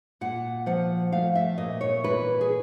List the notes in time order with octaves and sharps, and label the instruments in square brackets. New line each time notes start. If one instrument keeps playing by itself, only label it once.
[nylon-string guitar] A#2 F#5
F3 F#5
A3 F5
E5
A#2 D#5
C#5
E3 B4
G#4